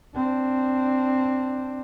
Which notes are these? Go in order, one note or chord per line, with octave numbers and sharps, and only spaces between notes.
C4 D4